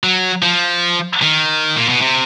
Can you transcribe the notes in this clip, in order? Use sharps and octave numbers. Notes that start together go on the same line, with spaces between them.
F#3
F3
D#3
A#2
B2
C3